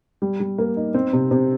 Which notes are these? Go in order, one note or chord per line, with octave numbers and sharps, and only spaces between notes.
G3
G3
A#3
D#4
C4
C3
C3